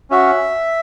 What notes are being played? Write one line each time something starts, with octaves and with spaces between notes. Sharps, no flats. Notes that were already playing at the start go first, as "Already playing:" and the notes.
C#4 F#4 E5